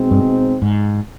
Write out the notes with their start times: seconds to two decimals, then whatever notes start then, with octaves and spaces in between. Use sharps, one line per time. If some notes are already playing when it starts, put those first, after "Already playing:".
Already playing: B2 G#3 C4 D#4
0.11 G2
0.62 G#2